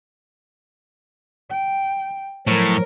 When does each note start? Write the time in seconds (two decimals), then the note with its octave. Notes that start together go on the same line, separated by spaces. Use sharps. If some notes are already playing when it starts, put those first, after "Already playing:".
1.50 G5
2.47 A2 F3 F#3 A#4